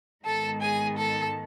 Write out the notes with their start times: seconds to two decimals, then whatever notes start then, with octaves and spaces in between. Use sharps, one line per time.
0.24 G#2 D#3 G#3 B3 A4 A5
0.61 G#4 G#5
0.97 A4 A5